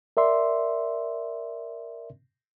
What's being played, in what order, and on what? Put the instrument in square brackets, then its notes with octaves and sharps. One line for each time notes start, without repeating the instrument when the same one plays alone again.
[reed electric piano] A#4 D5 E5 C6